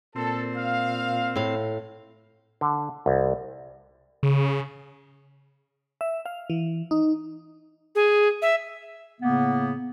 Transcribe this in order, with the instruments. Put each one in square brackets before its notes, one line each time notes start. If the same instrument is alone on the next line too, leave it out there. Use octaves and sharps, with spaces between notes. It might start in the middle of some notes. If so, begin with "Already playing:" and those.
[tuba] A#2 [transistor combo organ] C4 [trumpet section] A4
[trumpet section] F5
[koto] A2 F5
[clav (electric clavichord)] D3
C2
[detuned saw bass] C#3
[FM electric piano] E5
F5
E3
D#4
[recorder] G#4
E5
[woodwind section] A2 C#3 A#3 B3